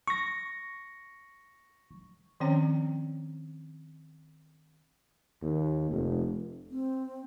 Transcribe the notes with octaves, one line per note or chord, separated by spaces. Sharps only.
C#6 A#6
D#3 F3 C4 C#4 C#5 G5
D#2
F1
C4